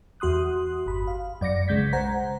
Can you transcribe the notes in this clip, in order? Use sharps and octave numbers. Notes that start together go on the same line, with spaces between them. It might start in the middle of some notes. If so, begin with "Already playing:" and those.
E2 F#4 C6 D#6 F#6
G1 B5
F5
F#2 D5 D6 A#6 C#7
B1 C#3 G#3 G6 G#6 B6
C5 F#5 A#5